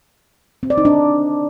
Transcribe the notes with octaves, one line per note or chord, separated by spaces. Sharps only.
C4
D5
D#4
D4